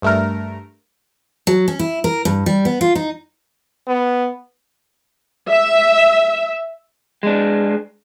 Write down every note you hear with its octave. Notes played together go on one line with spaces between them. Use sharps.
G2 A3 A#4
F#3
C#4
E4
A#4
G2
G3
B3
F4
D#4
B3
E5
G#3 D4